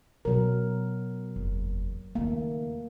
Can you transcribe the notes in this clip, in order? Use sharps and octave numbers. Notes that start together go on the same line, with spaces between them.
B2 F#3 A#4
F#1 E2
D#2 C#3 A3 A#3